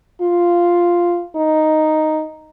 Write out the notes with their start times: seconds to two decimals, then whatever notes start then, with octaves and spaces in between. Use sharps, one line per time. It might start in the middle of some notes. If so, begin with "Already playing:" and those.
0.22 F4
1.36 D#4